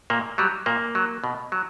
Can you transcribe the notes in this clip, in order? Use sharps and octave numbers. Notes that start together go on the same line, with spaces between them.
A#2 A#3
F#3 G3
A#2 A#3
F#3
B2
F#3